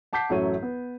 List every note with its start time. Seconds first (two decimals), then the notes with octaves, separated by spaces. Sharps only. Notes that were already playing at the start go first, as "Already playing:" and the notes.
0.13 F#5 A5 D6 G6 B6 C7
0.30 A1 F#2 F#3 A3 C#5 D#7
0.62 B3